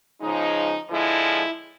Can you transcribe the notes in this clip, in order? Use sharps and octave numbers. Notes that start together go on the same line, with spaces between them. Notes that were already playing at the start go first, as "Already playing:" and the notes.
C#3 F3 G#3 D#4
D3 F3 G#3 E4